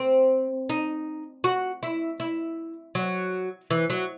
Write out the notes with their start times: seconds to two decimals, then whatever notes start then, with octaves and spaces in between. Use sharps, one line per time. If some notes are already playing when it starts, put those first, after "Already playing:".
Already playing: C4
0.69 D#4
1.44 F#4
1.83 E4
2.20 E4
2.95 F#3
3.70 E3
3.90 F#3